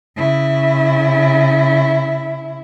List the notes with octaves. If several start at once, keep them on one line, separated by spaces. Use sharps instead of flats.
C#3 E4